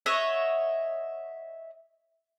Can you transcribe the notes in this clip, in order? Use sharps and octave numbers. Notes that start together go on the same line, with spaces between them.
C#5 D#5 E5 F#5